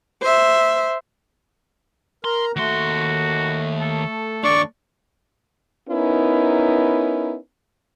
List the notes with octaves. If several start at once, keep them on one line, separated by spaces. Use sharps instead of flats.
C5 E5
A#4 A#5 C6
D#2 A3 F#4 C6
A4
D#2 D4 D5 C#6
B3 C#4 D#4 E4 A#4